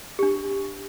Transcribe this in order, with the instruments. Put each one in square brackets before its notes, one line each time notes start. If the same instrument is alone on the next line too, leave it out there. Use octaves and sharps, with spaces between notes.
[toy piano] D4 G4